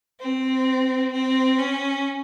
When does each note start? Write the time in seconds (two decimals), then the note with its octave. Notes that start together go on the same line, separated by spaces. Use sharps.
0.20 C4
1.12 C4
1.58 C#4